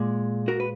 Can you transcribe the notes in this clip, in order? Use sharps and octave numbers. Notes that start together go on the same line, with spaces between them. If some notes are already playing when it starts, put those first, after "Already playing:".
Already playing: A#2 G#3
F#4 A#4
B4